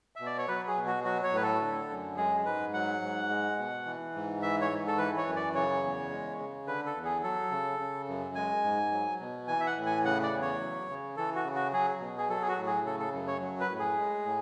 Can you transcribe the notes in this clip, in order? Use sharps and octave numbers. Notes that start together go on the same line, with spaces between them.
B2 E5
D5
C#5
F#3 B4
G#4
B2
F#4
F#3 F#4
C#5
A2 B4
A4
D3
F#2
G#3 G#4
G#2 B4
F#3 F#5
G#2
G#3
B2
E3
G#2
E3 E5
C#5
G#2
A4
E3 B4
C#5
F#2
D5
C#3 C#5
E2
G#3
C#3
D3 B4
A4
E2
G#4
F#3 A4
C#3
C#3
F#2
G#3 G#5
G#2
F#3
B2
E3 G#5
E5
F#5
A2
G#5
C#3 F#5
D5
E2
C#5
F#3
C#3
E3 A4
F#4
C#3
F#4
F#3 G#4
B2
G#4
F#3 A4
G#4
F#4
A2
G#4
C#3 A4
A4
F#2
C#5
F#3
B4
A2
G#4
G#3
A2